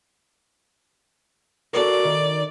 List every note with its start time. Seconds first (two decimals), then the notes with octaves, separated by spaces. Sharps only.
1.73 F#4 A4 A#4 D5
2.05 D#3